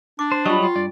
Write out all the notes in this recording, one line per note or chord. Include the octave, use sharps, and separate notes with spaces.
D4 D6
C5
F#3 G3 F4 D#5 B5 C#6
F4 G5
G2 D5